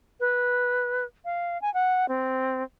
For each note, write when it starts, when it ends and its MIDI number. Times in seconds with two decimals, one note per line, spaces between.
0.20 1.05 71
1.25 1.60 77
1.61 1.72 80
1.74 2.08 78
2.08 2.63 60